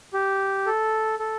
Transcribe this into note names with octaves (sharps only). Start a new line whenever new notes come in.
G4
A4
A4